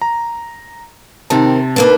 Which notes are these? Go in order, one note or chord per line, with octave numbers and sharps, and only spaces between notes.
A#5
C3 D#3 C4 A5
D#2 A#3 D4 B4